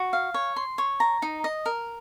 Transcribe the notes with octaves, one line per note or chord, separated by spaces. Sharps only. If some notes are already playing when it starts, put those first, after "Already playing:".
Already playing: F#4
F5
C#5
C6
C#5
A#5
D#4
D#5
A#4